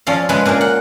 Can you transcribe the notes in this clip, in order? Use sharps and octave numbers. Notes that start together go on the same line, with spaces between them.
F3 C#4 A4 D5 F5
C#3 G#3 B4 E5 G#5 B5
A#2 D4 G#4 A#4
F#5